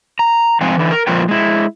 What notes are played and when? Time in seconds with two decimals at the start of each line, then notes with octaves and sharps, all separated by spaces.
0.19 A#5
0.61 G#2 F3 C4 F5 G#5
0.78 D3 E3
0.91 A#4
1.07 A#2 F3 F4 A#4 B4 G5
1.28 G#3 E4